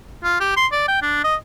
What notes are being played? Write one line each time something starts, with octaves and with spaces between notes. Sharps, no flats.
F4
G4
C6
D5
G5
D4
D#5